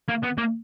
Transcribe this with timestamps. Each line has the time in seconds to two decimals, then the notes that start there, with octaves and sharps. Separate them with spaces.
0.09 A#3
0.24 B3
0.38 A#3